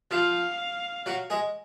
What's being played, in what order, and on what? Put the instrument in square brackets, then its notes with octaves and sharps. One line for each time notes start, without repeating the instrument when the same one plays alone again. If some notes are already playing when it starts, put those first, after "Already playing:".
[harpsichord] F3 F4 [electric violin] F5
[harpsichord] F#3 F#4
G#3 G#4